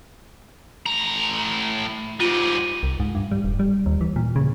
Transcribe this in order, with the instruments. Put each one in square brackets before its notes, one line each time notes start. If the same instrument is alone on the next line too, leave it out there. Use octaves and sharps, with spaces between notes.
[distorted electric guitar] A2 A#5
[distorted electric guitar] G#2 G3 [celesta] F4 D#7
[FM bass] C2
G#2
G2
G3
E1
G3
D#2
E3
A#2
C#3